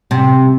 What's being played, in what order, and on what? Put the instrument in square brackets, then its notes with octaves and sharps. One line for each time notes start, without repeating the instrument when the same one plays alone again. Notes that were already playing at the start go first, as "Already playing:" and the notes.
[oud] C3